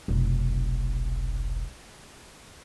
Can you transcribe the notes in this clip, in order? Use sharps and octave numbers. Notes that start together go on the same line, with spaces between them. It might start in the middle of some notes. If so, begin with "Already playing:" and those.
F1 B1